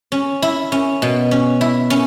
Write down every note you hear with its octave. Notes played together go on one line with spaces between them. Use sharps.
C#4
E4
C#4
B2
C#4
E4
C#4